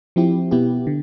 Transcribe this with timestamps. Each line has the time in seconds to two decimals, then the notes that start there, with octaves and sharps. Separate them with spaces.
0.16 F3 C4 E4 G4
0.51 B2 B3 E4 G4
0.87 D3